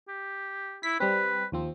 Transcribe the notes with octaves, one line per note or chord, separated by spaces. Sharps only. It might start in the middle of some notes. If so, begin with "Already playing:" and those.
G4
E4 B6
G3 C4 B4
D#2 F3 C4